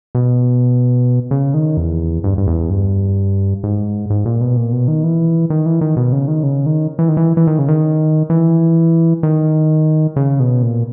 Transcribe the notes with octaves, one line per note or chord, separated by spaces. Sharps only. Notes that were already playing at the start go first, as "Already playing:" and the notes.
B2
C#3
D#3
E2
G2
G2
E2
G2
G#2
G#2
A#2
B2
A#2
B2
D#3
E3
D#3
E3
D#3
B2
C#3
D#3
C#3
D#3
E3
D#3
E3
E3
D#3
C#3
D#3
E3
D#3
C#3
B2
A#2